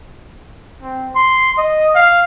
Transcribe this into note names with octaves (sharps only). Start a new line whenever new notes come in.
C4
C6
D#5
F5